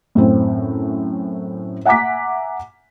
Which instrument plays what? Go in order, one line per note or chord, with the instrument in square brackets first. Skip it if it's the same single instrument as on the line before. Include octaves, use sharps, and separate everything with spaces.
[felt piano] F#2 A2 C4
E5 F#5 G#5 A#5 D6 B6